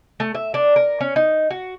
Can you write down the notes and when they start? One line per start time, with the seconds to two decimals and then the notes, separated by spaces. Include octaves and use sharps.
0.20 A3
0.35 E5
0.54 D4
0.76 A#4
1.00 C#4
1.16 D#4
1.50 F#4